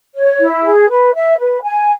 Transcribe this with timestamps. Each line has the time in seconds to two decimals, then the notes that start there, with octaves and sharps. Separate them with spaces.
0.14 C#5
0.40 E4
0.63 G#4
0.89 B4
1.14 E5
1.38 B4
1.62 G#5